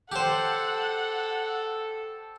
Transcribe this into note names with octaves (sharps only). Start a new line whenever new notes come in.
G4 A4 C5 F#5